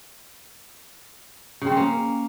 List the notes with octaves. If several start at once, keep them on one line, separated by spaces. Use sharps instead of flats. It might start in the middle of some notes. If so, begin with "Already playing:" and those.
C#3
C4
C#4
A#3